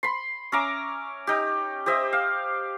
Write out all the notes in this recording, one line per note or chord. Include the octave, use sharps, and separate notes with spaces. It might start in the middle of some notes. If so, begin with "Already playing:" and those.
B5 C6
C#4 E5 A#5 D6
D#4 G4
G4 C5 D#5 E5
F5